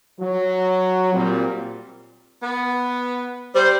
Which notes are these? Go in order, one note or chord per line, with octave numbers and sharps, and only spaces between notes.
F#3
A#2 G3 C4
B3
G3 C5